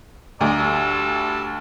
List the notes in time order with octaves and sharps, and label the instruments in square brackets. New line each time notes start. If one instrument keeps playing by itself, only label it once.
[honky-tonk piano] D2 [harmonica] D5 D#5 A#5
[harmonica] G3 A5 E6